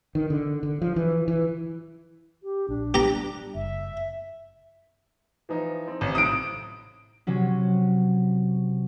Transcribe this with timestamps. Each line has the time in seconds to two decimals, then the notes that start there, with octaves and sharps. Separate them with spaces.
0.15 D#3
0.30 D3
0.63 D3
0.82 F3
0.96 E3
1.28 E3
2.43 G4
2.69 A#1 D4
2.94 G3 G4 A#5
3.55 F#1 E5
5.49 E3 F3 D#4
5.87 C4
6.01 A1
6.15 B1 A2 C3 D#6 D7
7.27 C3 F#3 C#4